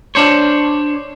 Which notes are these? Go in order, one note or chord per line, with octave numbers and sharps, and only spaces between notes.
D4 C5 C#5